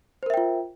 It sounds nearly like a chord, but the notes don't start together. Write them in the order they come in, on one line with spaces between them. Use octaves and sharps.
C5 A#4 E5 G5 F4